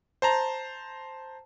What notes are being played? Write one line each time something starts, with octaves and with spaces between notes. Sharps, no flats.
C5 A5 A#5